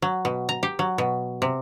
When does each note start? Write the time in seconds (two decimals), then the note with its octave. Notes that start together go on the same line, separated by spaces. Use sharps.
0.02 F#3
0.25 B2
0.49 A#5
0.63 G4
0.79 F#3
0.98 B2
1.42 C3